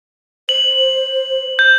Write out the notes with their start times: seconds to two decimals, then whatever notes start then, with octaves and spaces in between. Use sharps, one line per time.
0.49 C5 F#7
1.59 G6